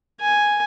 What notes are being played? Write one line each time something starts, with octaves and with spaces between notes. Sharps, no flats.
G#5